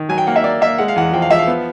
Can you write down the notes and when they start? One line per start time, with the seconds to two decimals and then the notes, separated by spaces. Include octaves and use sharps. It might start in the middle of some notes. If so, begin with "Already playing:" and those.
Already playing: D#3
0.09 F#3 G#5
0.18 G5
0.27 A#3 F#5
0.36 E5
0.44 A#3 D5
0.61 A#3 E5
0.78 G#3 F#5
0.88 F5
0.96 E2 F#5
1.13 F3 G5
1.22 F5
1.30 F3 E5
1.39 F5
1.48 B3